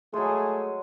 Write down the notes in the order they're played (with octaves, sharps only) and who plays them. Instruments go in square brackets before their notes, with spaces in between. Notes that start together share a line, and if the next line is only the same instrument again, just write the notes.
[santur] F#3 G#3 [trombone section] A3 G#4